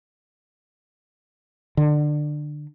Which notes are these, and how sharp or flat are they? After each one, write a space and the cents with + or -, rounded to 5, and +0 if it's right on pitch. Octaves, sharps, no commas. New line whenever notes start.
D3 +20